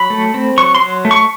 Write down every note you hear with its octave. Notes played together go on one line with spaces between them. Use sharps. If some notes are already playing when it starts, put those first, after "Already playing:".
Already playing: F#3 B5
A3
C4
F#3 C#6
C6
F#3
A3
C#6